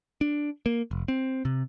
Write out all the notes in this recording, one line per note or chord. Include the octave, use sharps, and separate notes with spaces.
D4
A#3
F1
C4
C3